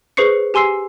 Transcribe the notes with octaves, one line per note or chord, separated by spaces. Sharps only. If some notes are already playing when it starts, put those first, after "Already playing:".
G#4 B4 C5 C#6 C7 C#7
G4 G#5 C6 E6 C7